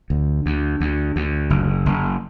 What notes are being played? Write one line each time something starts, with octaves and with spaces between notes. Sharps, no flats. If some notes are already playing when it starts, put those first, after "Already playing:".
D2
D2
D2
D2
F#1
F#1